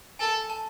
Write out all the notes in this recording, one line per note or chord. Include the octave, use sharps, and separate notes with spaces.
A4 G#5
A5